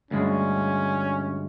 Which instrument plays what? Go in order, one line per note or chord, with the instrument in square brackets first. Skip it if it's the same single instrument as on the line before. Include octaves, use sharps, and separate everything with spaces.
[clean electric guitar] D2 G2 G#3 [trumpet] C#4